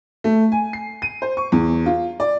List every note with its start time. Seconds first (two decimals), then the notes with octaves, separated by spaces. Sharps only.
0.24 A3
0.52 G#5
0.73 C7
1.02 D#7
1.22 C5
1.37 C#6
1.52 E2
1.86 F4
2.20 D5